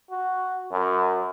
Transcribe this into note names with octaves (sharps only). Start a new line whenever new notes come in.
F#4
F#2